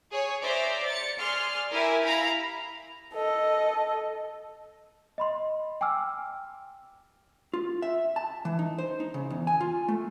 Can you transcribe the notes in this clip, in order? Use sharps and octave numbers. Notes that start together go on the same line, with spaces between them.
G#4 C#5
C5 D5 E5 A#5
A6 C#7
G#4 D5 C6 F6
E4 G4 A#4 E5 G#5
E4 F5 A#5 B5
A4 D#5
D#5 B5 C6
G5 G#5 D6 E6 F6
F4
E5
A5
E3
D#4
C5
D#4
C#3
E2
G#5
F4
A3